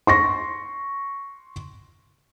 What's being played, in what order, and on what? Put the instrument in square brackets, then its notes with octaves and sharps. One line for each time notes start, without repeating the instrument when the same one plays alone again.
[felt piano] C6 C#6 A#6